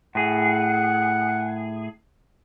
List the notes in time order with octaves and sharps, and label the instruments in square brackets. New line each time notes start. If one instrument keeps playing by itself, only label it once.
[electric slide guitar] A2 G#4 [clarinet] F#5